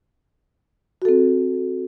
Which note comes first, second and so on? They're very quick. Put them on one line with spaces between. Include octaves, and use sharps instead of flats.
F#4 A4 C4